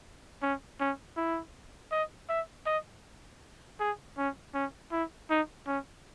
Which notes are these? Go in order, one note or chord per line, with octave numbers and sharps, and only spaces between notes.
C#4
C#4
E4
D#5
E5
D#5
G#4
C#4
C#4
E4
D#4
C#4